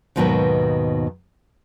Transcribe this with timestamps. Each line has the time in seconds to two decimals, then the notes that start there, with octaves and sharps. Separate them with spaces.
0.16 D#2 G#2 B2 D#3 F#3 B3